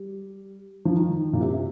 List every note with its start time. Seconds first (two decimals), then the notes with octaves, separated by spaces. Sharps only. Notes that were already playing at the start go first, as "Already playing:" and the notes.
Already playing: G3
0.85 F3
0.95 D#3
1.33 A#2
1.41 C3
1.53 C3